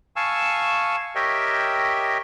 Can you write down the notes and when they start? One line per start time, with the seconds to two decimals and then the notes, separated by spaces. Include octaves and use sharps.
0.16 F5 G#5 A5 C#6 E6
1.15 G4 A#4 C#5 D#5 E5 G5